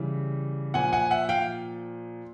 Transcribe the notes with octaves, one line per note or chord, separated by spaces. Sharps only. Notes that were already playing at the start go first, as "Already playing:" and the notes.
Already playing: C#3 E3 G3
A#2 F3 F#5 G#5
F#5 G#5
E5 F#5
F5 G5